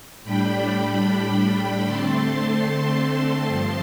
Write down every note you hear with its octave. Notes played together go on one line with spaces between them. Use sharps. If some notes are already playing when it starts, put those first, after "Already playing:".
A2 G3 D4 G5 B5
D3 A3 C4 A5 C6
G2 F3 C4 A5 C6